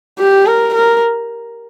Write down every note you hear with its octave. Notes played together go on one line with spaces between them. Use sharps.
G4
A#4
A#4